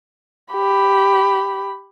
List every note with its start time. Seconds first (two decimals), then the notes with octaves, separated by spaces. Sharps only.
0.53 G4 B5